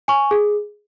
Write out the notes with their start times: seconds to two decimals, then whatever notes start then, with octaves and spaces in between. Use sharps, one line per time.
0.08 G#5 C#6
0.31 G#4